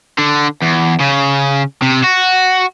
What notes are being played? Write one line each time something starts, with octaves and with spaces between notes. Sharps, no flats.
D3
E2
C#3
C3
F#4